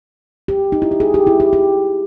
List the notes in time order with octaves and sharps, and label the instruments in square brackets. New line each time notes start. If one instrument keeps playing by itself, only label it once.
[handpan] G4
D#4
E4
G4
G#4
G4
E4
G4
G4